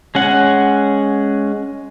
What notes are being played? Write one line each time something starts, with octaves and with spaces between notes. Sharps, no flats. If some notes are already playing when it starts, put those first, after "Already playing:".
G#3 C#4 F#5